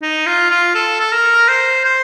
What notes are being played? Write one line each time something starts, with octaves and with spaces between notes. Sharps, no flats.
D#4
F4
F4
A4
A4
A#4
C5
C5